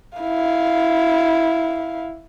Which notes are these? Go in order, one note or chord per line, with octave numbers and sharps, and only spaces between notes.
E4 F5